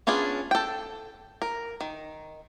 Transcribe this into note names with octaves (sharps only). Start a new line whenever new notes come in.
B3 C#4 D4 F4 G#4
A4 G5
A#4
D#3